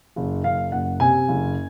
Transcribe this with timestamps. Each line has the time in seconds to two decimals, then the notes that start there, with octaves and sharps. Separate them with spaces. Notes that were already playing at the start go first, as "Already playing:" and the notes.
0.16 F#1
0.44 F#1 F5
0.72 F#1 F#5
1.00 C3 G#5
1.28 F#1